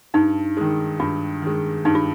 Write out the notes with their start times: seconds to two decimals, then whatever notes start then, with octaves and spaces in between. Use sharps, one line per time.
0.14 G2 D#4
0.57 D#3 G#3
1.00 G2 F4
1.42 D#3 G#3
1.85 G2 D#4
1.95 F4